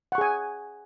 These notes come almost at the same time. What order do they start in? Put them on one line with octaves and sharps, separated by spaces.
F#5 C#6 G#4 G#5